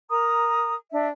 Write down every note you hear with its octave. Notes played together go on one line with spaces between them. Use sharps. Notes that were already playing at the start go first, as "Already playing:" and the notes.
A#4 A#5 D#6
D4 E5